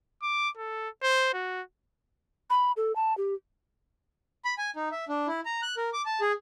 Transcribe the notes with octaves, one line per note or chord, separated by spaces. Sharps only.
D6
A4
C5
F#4
B5
A4
A5
G4
B5
G#5
D#4
E5
D4
E4
A#5
F#6
A#4
D6
A5
G#4